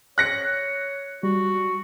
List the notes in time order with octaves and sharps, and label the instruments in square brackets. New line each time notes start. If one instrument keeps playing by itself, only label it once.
[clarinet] C#5 [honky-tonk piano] F#6 A#6 C#7
[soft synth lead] G3 [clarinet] F#4